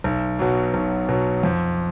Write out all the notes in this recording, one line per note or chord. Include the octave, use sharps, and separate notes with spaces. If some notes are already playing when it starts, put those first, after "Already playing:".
B1
B2 F#3
B1
B2 F#3
F2